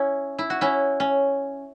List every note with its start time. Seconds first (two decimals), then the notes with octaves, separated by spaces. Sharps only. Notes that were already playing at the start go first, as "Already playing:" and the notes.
Already playing: C#4 E4
0.39 E4
0.50 F#4
0.61 C#4 E4
1.00 C#4